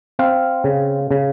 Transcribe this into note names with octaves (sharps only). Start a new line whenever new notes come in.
C4 F5
C#3
C#3